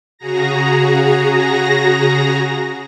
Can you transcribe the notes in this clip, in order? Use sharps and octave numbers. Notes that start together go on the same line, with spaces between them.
C#3 F#4 G#4 A#5 A#6